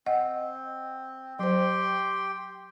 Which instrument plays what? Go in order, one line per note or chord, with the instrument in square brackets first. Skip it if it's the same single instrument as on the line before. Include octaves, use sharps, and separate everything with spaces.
[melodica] C4 [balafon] D#5 F#5
[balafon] F#3 C5 [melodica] G4 G5 C6